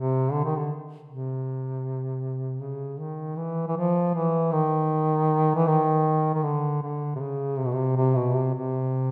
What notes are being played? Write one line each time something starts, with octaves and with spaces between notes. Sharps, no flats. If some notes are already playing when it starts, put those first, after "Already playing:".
Already playing: C3
D3
D#3
D3
C3
C#3
D#3
E3
E3
F3
E3
D#3
E3
D#3
D#3
D3
D3
C3
C#3
C3
B2
C3
C3
B2
C3
C3